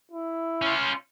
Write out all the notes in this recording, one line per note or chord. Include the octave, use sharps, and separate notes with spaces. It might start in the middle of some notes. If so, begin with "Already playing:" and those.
E4
C#4 F4